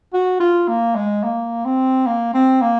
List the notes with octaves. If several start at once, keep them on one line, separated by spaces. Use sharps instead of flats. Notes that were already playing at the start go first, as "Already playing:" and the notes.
F#4
F4
A#3
G#3
A#3
C4
A#3
C4
A#3